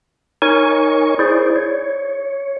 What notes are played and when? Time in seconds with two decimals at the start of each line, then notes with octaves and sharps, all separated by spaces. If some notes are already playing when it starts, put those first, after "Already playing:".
0.42 D#4 A#4 C#5 G#5 C#6
1.19 E4 G#4 C5 D5
1.56 C#5